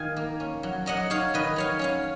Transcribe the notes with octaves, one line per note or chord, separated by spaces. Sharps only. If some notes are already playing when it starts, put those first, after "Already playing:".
Already playing: D#3 F5 G#5
A#3
C#4
F#3
F#3 D#5 F#5
D#4 C#5 F5
D#3 B4 D#5
F#3 C#5 F5
C#4 C#5 F5